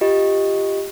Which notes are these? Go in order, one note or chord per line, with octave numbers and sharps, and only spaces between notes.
F4 G4 D#5